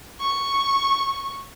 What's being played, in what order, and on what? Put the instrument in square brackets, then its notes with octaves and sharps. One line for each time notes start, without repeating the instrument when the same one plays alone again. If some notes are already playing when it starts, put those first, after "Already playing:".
[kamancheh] C#6